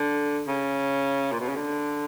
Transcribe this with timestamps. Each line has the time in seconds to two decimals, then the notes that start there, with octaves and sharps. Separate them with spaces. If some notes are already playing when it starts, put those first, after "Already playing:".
Already playing: D3
0.47 C#3
1.32 A#2
1.40 B2
1.48 C#3
1.56 D3